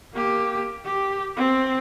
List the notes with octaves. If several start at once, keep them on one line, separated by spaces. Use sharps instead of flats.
A#3 G4
G4
C4